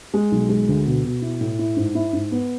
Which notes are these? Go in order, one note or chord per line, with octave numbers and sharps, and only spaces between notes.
G#3
B1
G#3
D2
B2
B2
E4
A2
E4
G#2
E4
G#2
B3